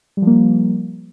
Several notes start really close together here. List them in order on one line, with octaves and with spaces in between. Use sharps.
G3 F3 A#3